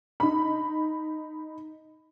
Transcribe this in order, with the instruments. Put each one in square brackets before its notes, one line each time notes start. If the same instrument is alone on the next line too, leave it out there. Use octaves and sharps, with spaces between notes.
[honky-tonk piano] D#4 B5